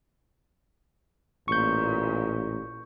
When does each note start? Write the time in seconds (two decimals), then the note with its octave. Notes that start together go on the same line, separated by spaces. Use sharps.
1.48 A1 A#2 C#6 G6